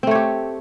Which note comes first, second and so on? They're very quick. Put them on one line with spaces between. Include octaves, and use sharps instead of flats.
C4 A3 C#5 G4